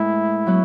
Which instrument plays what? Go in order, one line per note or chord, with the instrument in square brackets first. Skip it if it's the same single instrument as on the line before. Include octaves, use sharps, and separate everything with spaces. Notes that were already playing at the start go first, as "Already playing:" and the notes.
Already playing: [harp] A2 G#3 B3 [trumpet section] E4
[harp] F#3 B3